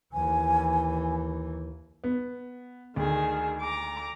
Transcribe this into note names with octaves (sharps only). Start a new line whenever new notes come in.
D#2 E3 G#5
B3
D2 D#3 G#4
A#5 D6